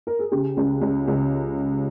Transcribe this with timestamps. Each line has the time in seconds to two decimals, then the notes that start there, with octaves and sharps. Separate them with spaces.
0.07 A#4
0.19 G#4
0.32 C#3 G4
0.57 C#2
0.81 C#2
1.08 C#2